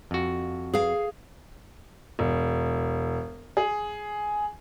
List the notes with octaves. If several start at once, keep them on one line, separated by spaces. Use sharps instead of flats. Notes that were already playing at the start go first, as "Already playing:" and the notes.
F2 F#4
G#4 F5
E1
G#4